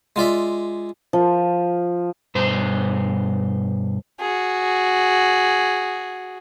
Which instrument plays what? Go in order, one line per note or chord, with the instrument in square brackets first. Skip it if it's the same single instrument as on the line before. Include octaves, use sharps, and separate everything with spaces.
[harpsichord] G#3 F4 D5 E5
[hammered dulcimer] F3
[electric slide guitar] G2 B2 C5
[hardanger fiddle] F#4 G#4